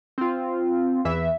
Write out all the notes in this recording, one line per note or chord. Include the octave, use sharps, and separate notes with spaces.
C4 F4
E2 E3 E5